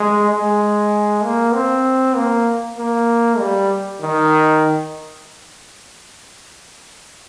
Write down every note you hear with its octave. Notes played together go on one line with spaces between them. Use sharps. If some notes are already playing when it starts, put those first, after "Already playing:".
Already playing: G#3
G#3
A#3
C4
A#3
A#3
G3
D#3